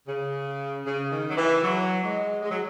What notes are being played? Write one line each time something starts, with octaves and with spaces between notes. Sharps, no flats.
C#3
C#3
D#3
F#3
E3
F#3
G#3
G#3
F#3